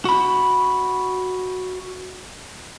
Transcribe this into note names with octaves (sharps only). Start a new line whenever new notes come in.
F#4 B5